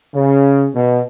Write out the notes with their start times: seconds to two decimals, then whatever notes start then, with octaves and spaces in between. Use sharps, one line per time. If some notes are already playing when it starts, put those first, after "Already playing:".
0.15 C#3
0.74 B2